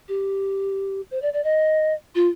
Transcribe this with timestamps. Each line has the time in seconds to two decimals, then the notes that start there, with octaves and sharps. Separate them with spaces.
0.08 G4
1.11 C5
1.22 D5
1.33 D5
1.44 D#5
2.15 F4